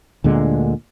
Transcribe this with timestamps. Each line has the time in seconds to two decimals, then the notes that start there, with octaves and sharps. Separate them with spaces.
0.24 D2 A#2 D3 G#3